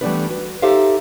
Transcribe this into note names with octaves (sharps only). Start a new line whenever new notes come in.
E3 G3 A3 B3 D4 B4
F#4 B4
D#4 G4 A4 C5 E5 F5